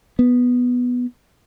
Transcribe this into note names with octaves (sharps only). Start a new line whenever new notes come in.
B3